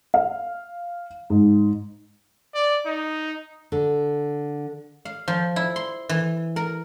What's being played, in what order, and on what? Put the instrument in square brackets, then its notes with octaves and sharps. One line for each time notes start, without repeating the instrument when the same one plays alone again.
[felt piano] F5
G#2
[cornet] D5
D#4
[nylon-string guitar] D3
[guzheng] F5
F3
E4
C6
E3
A#4